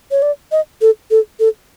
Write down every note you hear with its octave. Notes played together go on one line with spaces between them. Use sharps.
C#5
D5
D#5
A4
A4
A4